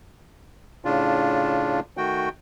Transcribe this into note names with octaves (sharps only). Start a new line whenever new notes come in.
A2 C#3 D4 F4
D#3 A3 F#4 G5